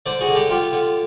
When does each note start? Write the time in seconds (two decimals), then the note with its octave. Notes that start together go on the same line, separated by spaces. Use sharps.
0.06 D3 C5 D5
0.21 F#4 G#4
0.28 D3
0.35 G4 A4
0.50 D3 F4 G4
0.73 D3